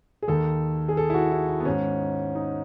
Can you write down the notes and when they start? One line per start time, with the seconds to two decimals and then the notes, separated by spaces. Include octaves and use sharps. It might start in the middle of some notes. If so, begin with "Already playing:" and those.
0.22 G#4
0.28 D#2 D#3 A4
0.89 G#4
0.97 A4
1.10 E4
1.14 F#4
1.32 E4
1.49 E4
1.60 B3
1.65 G#2 D#3 C#4
2.35 D#4